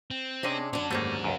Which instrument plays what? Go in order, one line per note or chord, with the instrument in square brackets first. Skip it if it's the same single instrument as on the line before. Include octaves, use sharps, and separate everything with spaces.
[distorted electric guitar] C4
[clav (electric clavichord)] C3 D#5 [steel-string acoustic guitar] C#4 D4 G#4
[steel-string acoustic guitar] D3 D4 [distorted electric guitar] C#4 F#4
[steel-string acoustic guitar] D#2 G#2 D3 [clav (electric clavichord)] A3 A#3
[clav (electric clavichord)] C#2 F#2